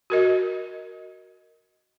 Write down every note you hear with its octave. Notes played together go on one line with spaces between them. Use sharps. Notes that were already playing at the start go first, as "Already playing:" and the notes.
F#4 A#4 D#5